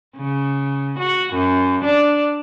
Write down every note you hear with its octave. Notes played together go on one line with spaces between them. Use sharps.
C#3
F#4
F#2
D4